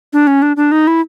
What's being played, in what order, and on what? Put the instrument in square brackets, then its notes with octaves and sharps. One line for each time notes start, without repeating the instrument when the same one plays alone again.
[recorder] D4
C#4
D4
D4
D#4
E4